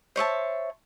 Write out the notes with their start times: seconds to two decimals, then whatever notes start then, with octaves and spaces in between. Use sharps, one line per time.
0.16 C5 C#5 E5 A5